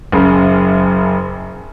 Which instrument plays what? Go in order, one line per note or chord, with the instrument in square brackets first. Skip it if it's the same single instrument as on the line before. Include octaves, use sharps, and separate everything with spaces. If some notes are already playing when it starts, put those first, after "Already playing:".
[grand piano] F#1 F#2 C#3